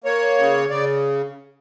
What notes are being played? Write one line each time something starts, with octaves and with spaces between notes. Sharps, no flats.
A#3 C#5
C#3
C#3 D5